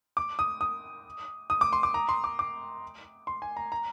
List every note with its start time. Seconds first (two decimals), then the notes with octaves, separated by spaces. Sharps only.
0.17 D6
0.39 D#6
0.61 D#6
1.50 D#6
1.61 D6
1.73 C6
1.83 D6
1.94 A#5
2.09 C6
2.24 D6
2.39 D6
3.27 C6
3.42 G#5
3.57 A#5
3.72 A#5